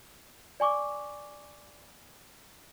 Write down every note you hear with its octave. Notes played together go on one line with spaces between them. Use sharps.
D5 G#5 C#6 D6